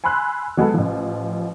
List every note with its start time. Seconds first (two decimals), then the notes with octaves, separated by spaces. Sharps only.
0.04 G#5 B5 C6 E6 F#6
0.57 F#3 G#3 B3 A4
0.74 A1 F3